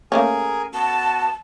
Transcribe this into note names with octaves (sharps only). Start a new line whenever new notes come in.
A3 A#3 C#4 G#4 A#4 G#5
B3 F#4 A5